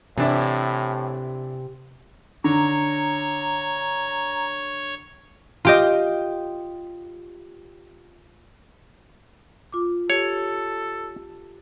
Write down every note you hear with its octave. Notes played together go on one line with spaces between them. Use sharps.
A2 C3 E3 D4 E4
D3 C#5 A#5
F4 G4 D#5
F4 D6
G4 A4 C#5